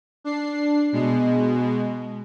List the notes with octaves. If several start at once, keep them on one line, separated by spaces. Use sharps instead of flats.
D4 C7
B2 G#3